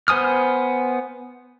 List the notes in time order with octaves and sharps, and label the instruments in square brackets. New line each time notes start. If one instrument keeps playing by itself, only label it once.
[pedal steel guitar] B3 C5 G#5 D#6 F6